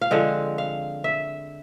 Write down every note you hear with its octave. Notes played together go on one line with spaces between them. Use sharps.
F5
D3 F3 G#3 C4 F#5
F5
E5